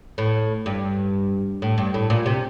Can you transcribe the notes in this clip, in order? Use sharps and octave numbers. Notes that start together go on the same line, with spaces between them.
A2
G2
A2
G2
A2
A#2
C3